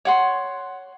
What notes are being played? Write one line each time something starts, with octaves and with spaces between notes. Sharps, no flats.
C#5 F#5 C6